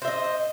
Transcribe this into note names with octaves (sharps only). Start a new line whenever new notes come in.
C5 D#5 E5